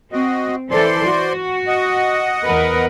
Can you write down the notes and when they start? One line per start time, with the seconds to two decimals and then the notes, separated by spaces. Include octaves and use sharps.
0.12 C4 F#4 D#5
0.71 E3 A4 C5 D5 C6
1.06 F#4
1.67 D#5 F#5
2.46 E2 A#4 B4